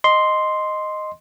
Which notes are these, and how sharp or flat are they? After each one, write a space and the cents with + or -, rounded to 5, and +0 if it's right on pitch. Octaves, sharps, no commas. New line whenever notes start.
D#5 -5 C6 +0